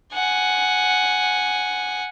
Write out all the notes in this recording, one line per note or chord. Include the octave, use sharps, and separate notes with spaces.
F#5 G#5